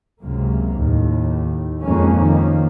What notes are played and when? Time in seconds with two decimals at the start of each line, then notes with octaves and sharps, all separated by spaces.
0.22 C#2 F#2 C3 A#3
0.79 D#2 A2
1.84 F2 G#2 G#3 A#3 C#4
2.17 D#3 F3 A#3